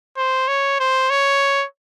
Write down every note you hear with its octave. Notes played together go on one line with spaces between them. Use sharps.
C5
C#5
C5
C#5